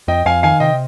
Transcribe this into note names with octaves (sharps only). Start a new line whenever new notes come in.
F2 D#5 G5
F2 F5 G#5
D#3 F5 G#5
C3 D#5 G5